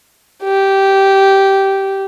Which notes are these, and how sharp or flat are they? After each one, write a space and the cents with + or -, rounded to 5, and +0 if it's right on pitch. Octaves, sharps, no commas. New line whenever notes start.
G4 -10